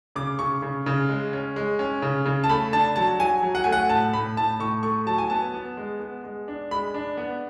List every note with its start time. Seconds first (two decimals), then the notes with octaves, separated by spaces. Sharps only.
0.16 C#3 D6
0.39 C#3 C#6
0.62 C#3
0.86 C#3
1.09 G#3
1.33 C#4
1.56 G#3
1.79 C#4
2.02 C#3
2.25 C#3
2.44 A5
2.49 A3 B5
2.73 D4 A5
2.96 F#3 A5
3.19 F#3 G#5
3.43 F#3
3.55 F#5
3.64 A3 G#5
3.72 F#5
3.90 A2 A5
4.13 A2 B5
4.37 A2 A5
4.60 A2 C#6
4.83 A3 C#6
5.06 F#3 A5
5.18 G#5
5.30 B3 A5
5.54 B3
5.77 G#3
6.00 B3
6.24 G#3
6.48 D4
6.71 G#3 B5
6.94 D4
7.17 B3